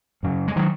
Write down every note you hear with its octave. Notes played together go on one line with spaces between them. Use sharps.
F#2 C#3
G#3
D#3 F#3